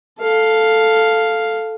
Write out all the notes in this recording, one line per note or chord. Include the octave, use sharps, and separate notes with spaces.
A4 F5